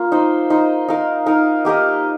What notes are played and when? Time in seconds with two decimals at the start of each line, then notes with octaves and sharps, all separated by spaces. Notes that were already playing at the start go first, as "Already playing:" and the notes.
Already playing: A#3 F4
0.12 D#4 C5 D#5
0.50 D#4 C5 D#5
0.88 D#4 A#4 F5
1.26 D#4 A#4 F5
1.65 A#3 G4 A#4 D#5